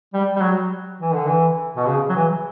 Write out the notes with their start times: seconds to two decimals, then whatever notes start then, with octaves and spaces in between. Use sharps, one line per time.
0.14 G3
0.36 G3
0.41 F#3
1.00 E3
1.14 D3
1.27 E3
1.77 B2
1.87 C#3
2.09 F#3
2.16 E3